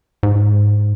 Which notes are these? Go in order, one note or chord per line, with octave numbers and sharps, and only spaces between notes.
G#2